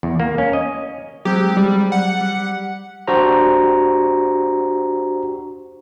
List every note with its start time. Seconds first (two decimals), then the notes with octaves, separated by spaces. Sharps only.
0.03 E2
0.20 A#3
0.38 C#4
0.53 D#5
1.25 F#3 G#3 C4 G4
1.57 G3
1.92 F#5
2.21 G3
3.08 D4 F#4 G4 C5 A#5